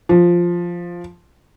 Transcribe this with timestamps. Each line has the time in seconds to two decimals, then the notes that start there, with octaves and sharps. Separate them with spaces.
0.09 F3